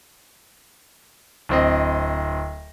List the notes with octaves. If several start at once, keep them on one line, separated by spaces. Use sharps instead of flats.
D1 C4 D#5